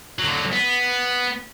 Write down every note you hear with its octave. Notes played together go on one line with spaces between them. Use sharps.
D3 F#3
B3